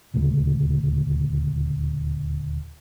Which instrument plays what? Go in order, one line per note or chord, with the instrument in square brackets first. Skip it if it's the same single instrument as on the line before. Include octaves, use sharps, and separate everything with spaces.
[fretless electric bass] D#1 D2 C#3 G#3